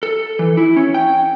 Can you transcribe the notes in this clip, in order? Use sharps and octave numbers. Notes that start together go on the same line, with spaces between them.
A4
E3
E4
C#4
G5